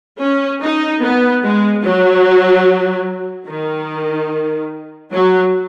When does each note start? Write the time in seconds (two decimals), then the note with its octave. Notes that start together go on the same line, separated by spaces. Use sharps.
0.21 C#4
0.62 D#4
1.03 B3
1.44 G#3
1.84 F#3
3.47 D#3
5.12 F#3